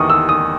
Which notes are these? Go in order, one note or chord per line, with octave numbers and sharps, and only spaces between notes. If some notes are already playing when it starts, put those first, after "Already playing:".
Already playing: E2 D#3 C#6 D#6
E6
D#6